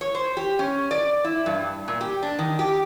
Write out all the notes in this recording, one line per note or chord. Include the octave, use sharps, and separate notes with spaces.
C#5
C5
G4
C#4
D5
E4
G2
A#2
G4
D4
D#3
G4